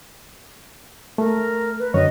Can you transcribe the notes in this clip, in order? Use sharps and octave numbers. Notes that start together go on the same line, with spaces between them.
A3 A#4
B4
F#2 D3 C#5 D#5